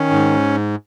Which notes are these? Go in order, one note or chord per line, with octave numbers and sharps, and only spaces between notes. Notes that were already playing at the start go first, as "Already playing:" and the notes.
Already playing: D#3 C#4
G#2